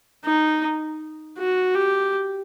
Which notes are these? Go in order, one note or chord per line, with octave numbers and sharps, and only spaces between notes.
D#4
F#4
G4